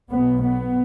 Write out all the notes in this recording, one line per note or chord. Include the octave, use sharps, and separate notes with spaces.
B1 B2 B3
B3